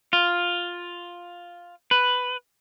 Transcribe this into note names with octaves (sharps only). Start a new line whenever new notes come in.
F4
B4